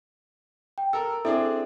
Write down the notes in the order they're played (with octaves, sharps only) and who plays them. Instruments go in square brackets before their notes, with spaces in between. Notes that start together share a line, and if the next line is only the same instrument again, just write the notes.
[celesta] G5
[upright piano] A4 A#4 [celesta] E6
[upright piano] C4 D4 G#4 [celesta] E4 A4 E5